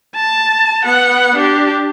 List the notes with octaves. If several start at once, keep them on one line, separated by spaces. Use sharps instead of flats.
A5
B3 F#5
D4 G4